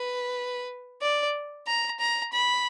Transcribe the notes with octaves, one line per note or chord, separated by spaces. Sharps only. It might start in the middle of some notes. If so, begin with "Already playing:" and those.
Already playing: B4
D5
A#5
A#5
B5